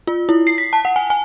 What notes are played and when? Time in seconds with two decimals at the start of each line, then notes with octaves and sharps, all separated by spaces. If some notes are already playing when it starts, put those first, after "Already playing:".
0.07 F4
0.29 E4
0.47 C7
0.58 B6
0.73 A5
0.85 F#5
0.96 G#5
1.10 G#5